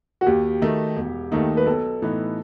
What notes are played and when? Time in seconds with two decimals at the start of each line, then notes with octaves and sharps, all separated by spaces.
0.21 F#4
0.26 D#2 G4
0.62 D#3 A3 D#4
0.96 E1
1.32 D#2 D#3 A3 D#4
1.57 B4
1.66 B1 A4
2.02 A2 E3 B3 D#4